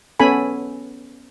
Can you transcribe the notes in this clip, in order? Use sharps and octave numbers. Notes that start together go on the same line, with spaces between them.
B3 C#4 A4 G#5 B5